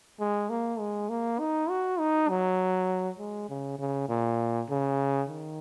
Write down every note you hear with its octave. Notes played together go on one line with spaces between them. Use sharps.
G#3
A#3
G#3
A#3
D#4
F#4
D#4
F#3
G#3
C#3
C#3
A#2
C#3
D#3